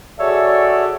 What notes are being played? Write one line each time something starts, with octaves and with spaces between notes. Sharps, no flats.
F#4 G#4 A4 C#5 D5 E5